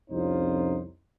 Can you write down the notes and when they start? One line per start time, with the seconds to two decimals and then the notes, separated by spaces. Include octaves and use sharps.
0.10 C2 F2 C#4 D#4 F4 C5